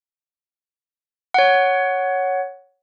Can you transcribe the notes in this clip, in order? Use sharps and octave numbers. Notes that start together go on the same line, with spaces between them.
C#5 F#5